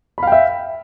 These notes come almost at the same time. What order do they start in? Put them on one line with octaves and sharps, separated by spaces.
B5 F5 G5 E5